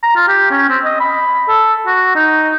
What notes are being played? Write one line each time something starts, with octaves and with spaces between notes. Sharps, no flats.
A#5
F4
G4
C#4
C4
D#5
B5
A4
F#4
D#4